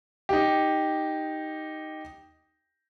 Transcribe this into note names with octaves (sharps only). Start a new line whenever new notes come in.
D#4 G4